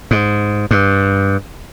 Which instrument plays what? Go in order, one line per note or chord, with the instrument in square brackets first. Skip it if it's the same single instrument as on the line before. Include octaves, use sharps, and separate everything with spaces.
[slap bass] G#2
G2